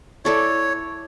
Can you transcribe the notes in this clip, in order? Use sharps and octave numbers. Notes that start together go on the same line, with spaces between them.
E4 A4 C#5 D5